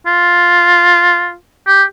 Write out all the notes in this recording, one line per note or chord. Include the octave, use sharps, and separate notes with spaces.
F4
G4